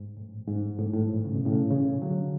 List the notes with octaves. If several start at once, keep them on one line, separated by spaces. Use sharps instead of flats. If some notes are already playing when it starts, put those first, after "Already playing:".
Already playing: G#2
A2
G#2
A2
G#2
A2
C#3
B2
A2 C#3
C#3 E3
D3 F#3